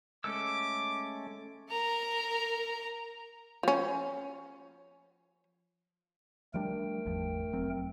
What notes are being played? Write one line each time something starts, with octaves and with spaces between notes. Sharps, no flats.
G#3 A3 C#4 A4 D6 E6
A#4 A#5
F3 C#4
F3 G3 A3 D4 A#4 G5
G#1 E2 F3
F1 F#3 C4